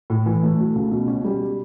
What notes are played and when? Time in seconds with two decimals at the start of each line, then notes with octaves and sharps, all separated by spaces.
0.10 A2
0.26 E3
0.43 A3
0.60 F#3
0.75 C#2
0.91 B2
1.08 C#4
1.24 G3